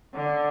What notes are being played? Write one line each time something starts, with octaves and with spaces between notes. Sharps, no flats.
D3